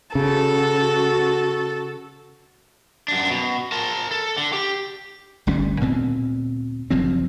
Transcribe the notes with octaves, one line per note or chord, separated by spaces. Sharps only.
C#3 F#4 A4
F#2 D4
B2
A#4 A5
A4
D3
G4
G1 D2 G3 C#4
D2 A#2 B3 C4
F#1 F3 F#3 C4